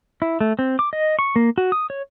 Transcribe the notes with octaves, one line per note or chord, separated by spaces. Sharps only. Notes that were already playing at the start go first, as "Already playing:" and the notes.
E4
A3
C4
D6
D#5
C#6
A#3
F#4
D#6
C#5